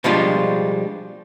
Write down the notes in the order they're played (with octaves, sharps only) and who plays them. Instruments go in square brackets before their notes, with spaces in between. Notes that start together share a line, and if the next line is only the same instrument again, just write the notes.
[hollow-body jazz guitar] B2 F3 G3 G#3 D4 F4